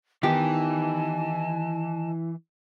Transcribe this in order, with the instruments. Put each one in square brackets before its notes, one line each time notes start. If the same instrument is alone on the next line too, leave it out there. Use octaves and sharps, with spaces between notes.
[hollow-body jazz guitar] D#3 B3 D#4 [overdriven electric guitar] E3 [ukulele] G4 [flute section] D#5 G#5 A5